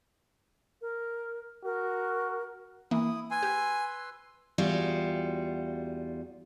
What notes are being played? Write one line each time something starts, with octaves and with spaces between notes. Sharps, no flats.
A#4
F#4 A#4
E3 A#3 E4 D#6
B4 G#5 C6 E6
G4
E2 G3 F4 F#4